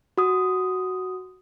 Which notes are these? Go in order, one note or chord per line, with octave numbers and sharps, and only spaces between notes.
F#4 D#6